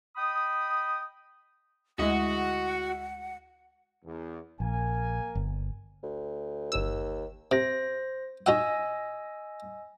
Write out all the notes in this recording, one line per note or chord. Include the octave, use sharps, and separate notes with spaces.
D#5 G5 B5 D#6
D2 G#3 E4 F#4 D#5 F#5
E2
A#1 A#3 A#4 G#5
G1
D2
G1 D#2 E6
C3 C5 A#6
D#4 F#4 D#5 F#5 G#5 E6